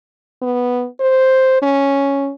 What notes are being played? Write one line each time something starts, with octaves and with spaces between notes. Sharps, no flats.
B3
C5
C#4